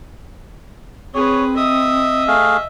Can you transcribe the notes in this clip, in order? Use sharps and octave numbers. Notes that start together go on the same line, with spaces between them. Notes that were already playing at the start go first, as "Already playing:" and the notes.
C4 G#4 B4 C#5
D#5 E5 D#6
A3 G#4 F5